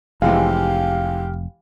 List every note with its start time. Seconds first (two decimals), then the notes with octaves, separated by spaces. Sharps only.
0.22 F1 C3 E3 G#3 G4 F5